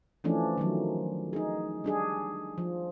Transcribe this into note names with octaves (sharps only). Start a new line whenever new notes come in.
E3 F3 A3 C#4 D4
D#3 F3 F#3
D#4 G#4
G3 D4 G#4
F3